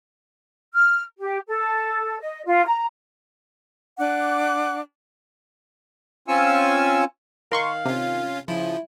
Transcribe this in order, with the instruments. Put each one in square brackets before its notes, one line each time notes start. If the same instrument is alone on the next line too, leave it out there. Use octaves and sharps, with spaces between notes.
[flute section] F6
G4
A4
D#5
F4
A#5
D4 F#5 D6 F#6
[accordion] C4 C#4 F4 G#5 C#6 E6
[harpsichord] D#3 [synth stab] A#4 C6 C#6 [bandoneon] F5
[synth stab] C3 [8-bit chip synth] C#4 F4
[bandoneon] C#3 [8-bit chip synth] F3 [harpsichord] E4